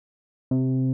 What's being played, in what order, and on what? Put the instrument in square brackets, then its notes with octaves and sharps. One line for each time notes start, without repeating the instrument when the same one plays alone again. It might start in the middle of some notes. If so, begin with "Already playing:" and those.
[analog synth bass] C3